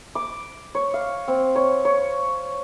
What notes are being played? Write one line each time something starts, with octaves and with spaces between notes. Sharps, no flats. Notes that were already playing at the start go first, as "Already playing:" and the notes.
D6
C#5
F5
C4
C#5
C#5